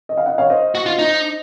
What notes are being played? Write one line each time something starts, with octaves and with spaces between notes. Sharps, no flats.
D#5
F5
D#5 F#5
C#5 F5
C5 D#5
F#4
F4
D#4